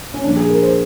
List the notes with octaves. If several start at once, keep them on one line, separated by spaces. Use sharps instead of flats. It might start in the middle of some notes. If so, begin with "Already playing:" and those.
C#4
A#2 F3 D4
G#4
A#4
C5